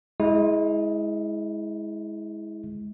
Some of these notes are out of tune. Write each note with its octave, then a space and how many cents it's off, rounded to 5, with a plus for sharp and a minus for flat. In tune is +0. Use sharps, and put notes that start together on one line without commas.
G#3 +10 E4 -25